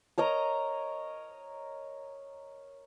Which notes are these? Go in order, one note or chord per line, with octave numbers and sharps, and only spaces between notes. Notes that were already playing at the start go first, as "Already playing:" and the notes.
A#4 C#5 D#5 A#5